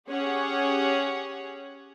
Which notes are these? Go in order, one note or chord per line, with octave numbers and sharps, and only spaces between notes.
C#4 G4 G#4 C#5 F#5